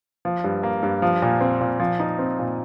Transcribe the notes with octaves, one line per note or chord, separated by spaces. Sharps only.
F3
G2
A#3
G2
F3
A#2
C4
A#2
F3
D#4
C4
A#2